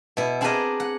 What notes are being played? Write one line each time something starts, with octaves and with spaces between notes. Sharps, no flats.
B2 E4
C4 D4 G#4 A#4 B4 D#5
F#5